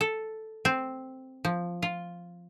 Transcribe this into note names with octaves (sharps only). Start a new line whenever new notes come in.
A4
C4
F3
F4